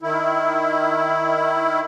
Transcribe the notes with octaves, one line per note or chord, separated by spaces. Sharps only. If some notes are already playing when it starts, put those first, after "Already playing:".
D#3 E4